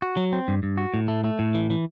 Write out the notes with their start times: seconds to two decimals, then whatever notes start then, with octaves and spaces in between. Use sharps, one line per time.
0.02 F#4
0.17 F#3
0.33 C4
0.48 G2
0.63 G2
0.78 F#4
0.94 A2
1.08 A3
1.24 A3
1.39 A2
1.54 E3
1.70 E3